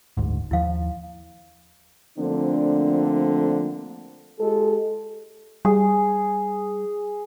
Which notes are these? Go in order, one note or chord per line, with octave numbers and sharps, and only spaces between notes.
F#1 D2 G#2
D#2 F3 E4 F5
D3 F3 A3 A#3 C4 D4
G#3 F4 G4 A4
G3 G#4